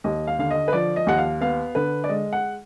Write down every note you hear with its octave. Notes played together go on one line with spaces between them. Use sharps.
D#2 D#5
F5
D3 F5
D#5
B4
F3 D5
D#5
D#2 F#5
F5
B3 F5
D3 B4
D5
G#3 D#5
F#5